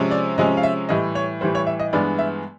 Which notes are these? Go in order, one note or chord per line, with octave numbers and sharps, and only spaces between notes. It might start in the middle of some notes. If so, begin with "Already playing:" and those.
Already playing: C3 F3 G#3 C#4
D5
C3 F3 G#3 C#4 D#5
F5
E5
A2 E3 G3 D#5
C#5
A2 E3 G3 C5
C#5
E5
D#5
G2 E3 G#3 B3 D5
E5